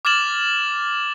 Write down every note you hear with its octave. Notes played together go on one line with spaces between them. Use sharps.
D6 F6 G#6 A6 E7 F#7